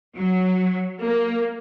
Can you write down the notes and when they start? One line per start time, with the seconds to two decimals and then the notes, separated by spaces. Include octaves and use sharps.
0.17 F#3
1.03 A#3